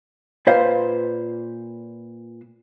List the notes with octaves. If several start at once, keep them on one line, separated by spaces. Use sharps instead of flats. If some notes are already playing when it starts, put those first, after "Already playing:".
A#2 B4 C5 F5